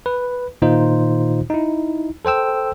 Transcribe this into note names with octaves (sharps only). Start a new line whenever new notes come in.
B4
A#2 D#3 D#4 F4 C5
D#4 E4
A4 C5 G5 E6